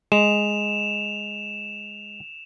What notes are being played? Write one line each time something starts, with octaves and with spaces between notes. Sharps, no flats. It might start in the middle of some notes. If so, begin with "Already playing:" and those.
G#3 E7 F7